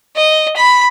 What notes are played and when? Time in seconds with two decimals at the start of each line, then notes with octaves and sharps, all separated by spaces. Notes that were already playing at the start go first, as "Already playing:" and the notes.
0.17 D#5
0.57 B5